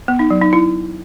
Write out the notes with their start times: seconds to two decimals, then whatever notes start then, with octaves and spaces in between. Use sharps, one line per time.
0.08 B3
0.19 D#4
0.30 F#3
0.42 D#4
0.53 E4